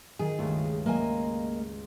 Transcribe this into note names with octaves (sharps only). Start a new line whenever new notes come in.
D#3 G#4
C#2 G2 A3
A#3 D#5 G#5